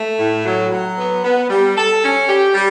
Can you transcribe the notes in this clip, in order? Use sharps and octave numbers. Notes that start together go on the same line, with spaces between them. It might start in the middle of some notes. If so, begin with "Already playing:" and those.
Already playing: A3
A2
F#3
F#3
B3
B3
G3
A4
C#4
G4
G3